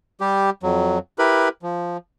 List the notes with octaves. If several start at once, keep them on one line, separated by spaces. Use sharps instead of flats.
G3 G4
F2 F#3
E4 G4 A#4 B4 B5
F3